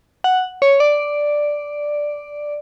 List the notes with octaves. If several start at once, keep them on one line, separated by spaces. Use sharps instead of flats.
F#5
C#5
D5